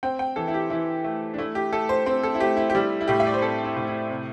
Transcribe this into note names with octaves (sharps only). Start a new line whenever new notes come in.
C4 G5
G5
E3 A4
E4
G4
E3 E4
A3
D4
A3 E4
G4
A3 A4
C5
C4 C5
A4
E4
A3 G4
E4
G4
G3 E4
E4
A2 G4
E5
D5
C5
C4 A4
E4
A2
E4
C3